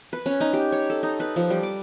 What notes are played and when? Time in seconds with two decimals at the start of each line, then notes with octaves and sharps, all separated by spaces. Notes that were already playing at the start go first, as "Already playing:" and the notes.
0.13 B4
0.26 C#4
0.41 D#4
0.53 G4
0.72 C#5
0.90 A4
1.03 D#4
1.20 B4
1.36 F3
1.50 G3
1.63 D6